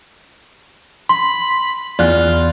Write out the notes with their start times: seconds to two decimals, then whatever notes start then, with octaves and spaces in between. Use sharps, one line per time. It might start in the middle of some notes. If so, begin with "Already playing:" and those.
1.09 B5 C6
1.99 E2 F4 D5 F#6